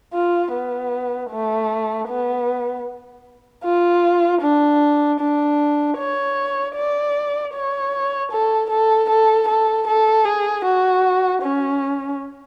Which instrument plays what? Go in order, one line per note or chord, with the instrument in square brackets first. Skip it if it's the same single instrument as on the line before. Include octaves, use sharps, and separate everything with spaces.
[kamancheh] F4
B3
A3
B3
F4
D4
D4
C#5
D5
C#5
A4
A4
A4
A4
A4
G#4
F#4
C#4